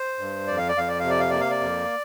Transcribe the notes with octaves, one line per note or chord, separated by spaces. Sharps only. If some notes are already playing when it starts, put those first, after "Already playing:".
Already playing: C5
G2
F2 D5
F5
D5
F2 F5
D5
C3 F5
D5
F5
A#3 D5
F5
D5
F2